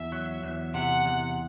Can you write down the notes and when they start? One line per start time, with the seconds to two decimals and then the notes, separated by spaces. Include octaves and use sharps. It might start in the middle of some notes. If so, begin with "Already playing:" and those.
Already playing: E2 E5
0.12 F#3
0.43 E2
0.74 C3 F#5
1.06 E2